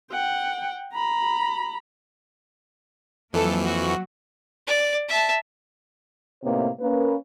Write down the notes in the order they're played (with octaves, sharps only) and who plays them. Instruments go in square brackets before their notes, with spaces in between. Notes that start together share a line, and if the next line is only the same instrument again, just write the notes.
[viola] F#5 G5
A#5 B5
[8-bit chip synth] F2 E3 [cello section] F#3 A#3 [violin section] A4
[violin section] F#4
[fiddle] D5
E5 A5
[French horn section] A2 C3 A#3 B3 D#4 C#5
A#3 C#4 B4